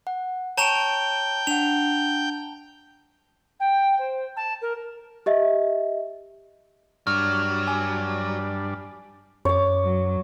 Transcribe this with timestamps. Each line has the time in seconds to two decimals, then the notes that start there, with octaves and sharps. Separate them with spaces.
0.07 F#5
0.57 C#5 G5 A5 A#5 C#6 D7 F7
1.47 D4 F#5 F7
3.59 G5
3.98 C5
4.36 A5
4.61 A#4
5.26 G4 D#5 E5
7.07 G2 F#3 D4 F6
7.67 G#5
9.45 F#2 C#5 D6
9.84 F#3